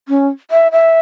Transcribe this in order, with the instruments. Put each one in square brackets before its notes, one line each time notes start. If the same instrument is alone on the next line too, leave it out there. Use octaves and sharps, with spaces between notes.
[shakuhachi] C#4
E5
E5